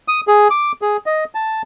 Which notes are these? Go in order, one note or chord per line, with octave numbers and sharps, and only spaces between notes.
D#6
G#4
D6
G#4
D#5
A5